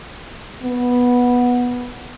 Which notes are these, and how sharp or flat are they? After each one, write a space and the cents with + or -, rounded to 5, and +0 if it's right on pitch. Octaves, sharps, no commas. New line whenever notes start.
B3 -10